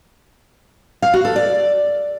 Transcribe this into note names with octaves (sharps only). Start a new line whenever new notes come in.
F5
F#4
A4
D5